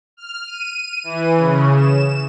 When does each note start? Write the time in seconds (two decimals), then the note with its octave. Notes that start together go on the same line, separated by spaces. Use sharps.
0.17 F6
0.47 D#7
1.04 E3
1.37 C#3
1.75 E7